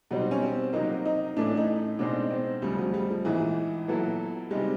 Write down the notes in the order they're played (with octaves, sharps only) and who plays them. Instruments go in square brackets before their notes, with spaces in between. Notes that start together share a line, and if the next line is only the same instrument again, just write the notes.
[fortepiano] B2 G3 C4 D#4 [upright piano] F#3
[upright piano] C#4
C4
[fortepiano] C3 D#3 F#3 A#3 [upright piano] D#4
[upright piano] D#4
[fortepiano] A2 E3 A3 C#4 [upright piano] D4
[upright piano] D#4
[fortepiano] B2 G#3 C4 D#4 [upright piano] D4
[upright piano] C4
[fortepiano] D2 C#3 F3 [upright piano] G3
[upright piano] F#3
G3
F3
[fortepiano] A#1 G#2 D#3 [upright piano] E3
[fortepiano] A#2 F#3 B3 E4 A4
[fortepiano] C3 D#3 G#3 [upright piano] G3